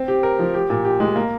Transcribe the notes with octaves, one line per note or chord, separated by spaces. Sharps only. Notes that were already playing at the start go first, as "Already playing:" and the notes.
Already playing: C4
G4
A#4
F3
G4
A#2
G4
G#3
A#3